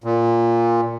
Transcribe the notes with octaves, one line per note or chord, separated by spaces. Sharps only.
A#2